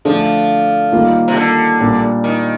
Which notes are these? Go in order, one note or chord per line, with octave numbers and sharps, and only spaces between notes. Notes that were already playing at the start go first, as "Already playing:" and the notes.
D3 F3 A3 D4
D#3 G3 A#3 F4
C3
D3
A#2 G3 D4
D#3